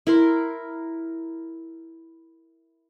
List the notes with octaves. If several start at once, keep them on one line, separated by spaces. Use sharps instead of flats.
E4 A#4 C6